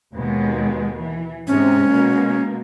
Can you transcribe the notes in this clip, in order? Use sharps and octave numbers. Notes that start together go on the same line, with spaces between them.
D#2 B2 G#3
E3
G#2 C3 G#3 C#4
B2 G#3 A#3